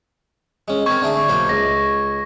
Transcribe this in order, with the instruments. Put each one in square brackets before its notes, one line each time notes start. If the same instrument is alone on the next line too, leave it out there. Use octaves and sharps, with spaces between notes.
[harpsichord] G#3 C#4
[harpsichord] C4 A#4 [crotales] C#6 G#6
[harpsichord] D3 A3 G#4
B1 A#3 C5
[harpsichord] C#2 [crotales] A#6